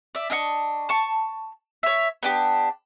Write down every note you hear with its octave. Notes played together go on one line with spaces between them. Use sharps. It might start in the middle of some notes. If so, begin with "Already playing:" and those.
D5 E5
D4 D#5 E5 C#6
A5 C#6
C#5 E5
B3 D4 G4